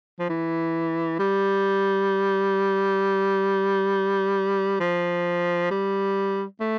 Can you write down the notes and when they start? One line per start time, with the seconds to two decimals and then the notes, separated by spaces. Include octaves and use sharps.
0.20 F3
0.30 E3
1.19 G3
4.80 F3
5.71 G3
6.61 A3